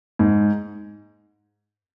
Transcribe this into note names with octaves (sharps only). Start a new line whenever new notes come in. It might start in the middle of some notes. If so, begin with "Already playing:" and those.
G#2